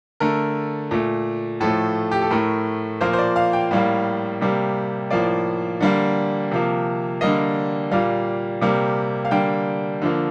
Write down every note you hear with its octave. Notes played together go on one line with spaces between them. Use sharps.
D3 A3 A#4
A#2 A3
A2 F3 A3 A4
G4
A4
A2 A3 A#4
A#2 F3 A#3 C5
C5
D5
F5
G5
A2 G3 A#3 F5
C3 G3 A#3
A2 F3 A#3 D5
D3 G3 A#3
C3 F3 A#3
D3 G3 A#3 D#5
A#2 G3 A#3 F5
C3 G3 A#3
F5
D3 G3 A#3 G5
D3 F3 A#3